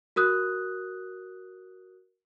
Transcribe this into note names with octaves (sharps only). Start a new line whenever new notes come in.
F#4 A#4 D#6 F#6